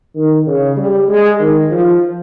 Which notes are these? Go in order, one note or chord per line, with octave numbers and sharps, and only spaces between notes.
D#3
C#3
G3
G#3
D#3
F3